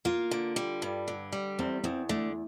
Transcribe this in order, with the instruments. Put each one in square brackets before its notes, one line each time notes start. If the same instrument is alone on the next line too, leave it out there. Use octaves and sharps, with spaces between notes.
[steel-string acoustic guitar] A#3 [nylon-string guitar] F4
[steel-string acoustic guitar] D3
G3
G2
D3
G3
[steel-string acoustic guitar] E2 [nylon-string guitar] C4
[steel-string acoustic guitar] E2 [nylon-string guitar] C4
[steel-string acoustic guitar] D3 [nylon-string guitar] A3